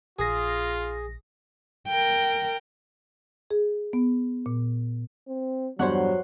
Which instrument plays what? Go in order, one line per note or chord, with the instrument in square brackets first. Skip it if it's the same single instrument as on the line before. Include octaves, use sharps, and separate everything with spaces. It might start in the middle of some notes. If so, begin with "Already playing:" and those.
[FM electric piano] A#1 A#6 [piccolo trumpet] F4 [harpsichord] G#4
[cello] A#4 G5
[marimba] G#4
B3
A#2
[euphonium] C4
[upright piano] E2 G2 [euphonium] F#3 [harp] C5 C#5 F#5